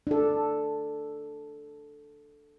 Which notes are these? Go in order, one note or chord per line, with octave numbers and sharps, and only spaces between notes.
D4 A4